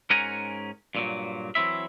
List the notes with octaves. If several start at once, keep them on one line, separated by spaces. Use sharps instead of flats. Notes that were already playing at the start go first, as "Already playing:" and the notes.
G#2 C#4 A#4 F#5 G#5 A#5
G2 A#2 F#3
E3 F#3 C4 E4 E5